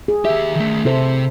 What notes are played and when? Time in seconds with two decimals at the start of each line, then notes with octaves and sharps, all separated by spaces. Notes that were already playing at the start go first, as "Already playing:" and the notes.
0.08 G#4
0.25 D#2 G4 E5
0.56 D#3 A3
0.85 C3 E4 A4 C5